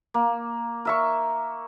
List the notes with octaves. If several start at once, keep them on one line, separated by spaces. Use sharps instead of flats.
A#3
A#4 E5 C#6